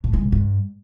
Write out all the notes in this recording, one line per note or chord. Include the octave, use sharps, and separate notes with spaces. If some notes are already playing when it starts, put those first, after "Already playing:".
A2
G#3
B2
G2